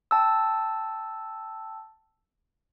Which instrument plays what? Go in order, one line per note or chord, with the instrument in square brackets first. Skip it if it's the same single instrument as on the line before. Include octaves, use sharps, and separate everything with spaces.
[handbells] G5 A5 E6